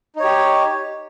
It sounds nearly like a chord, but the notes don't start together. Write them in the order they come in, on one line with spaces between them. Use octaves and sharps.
D#4 C#5 G4